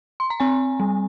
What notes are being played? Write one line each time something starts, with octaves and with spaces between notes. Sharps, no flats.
C6
A#5
C4 G#5
G3